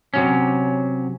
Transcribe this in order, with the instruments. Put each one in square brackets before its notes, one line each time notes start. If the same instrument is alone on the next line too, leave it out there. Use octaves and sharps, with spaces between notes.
[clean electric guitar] C3 F#3 C#4